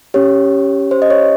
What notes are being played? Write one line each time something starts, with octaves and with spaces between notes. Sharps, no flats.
C#4 G4 C#5
C5
D#5
C#5